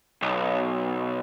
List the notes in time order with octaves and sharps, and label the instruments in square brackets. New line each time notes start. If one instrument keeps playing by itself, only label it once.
[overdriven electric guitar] B1